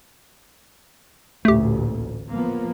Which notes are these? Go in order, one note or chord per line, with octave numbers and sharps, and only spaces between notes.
A1 D2 A#2 A3 G4
F3 A#3 B3